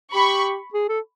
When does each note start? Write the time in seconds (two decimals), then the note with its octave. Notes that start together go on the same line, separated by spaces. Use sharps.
0.13 G4 B5 C#6
0.73 G#4
0.89 A4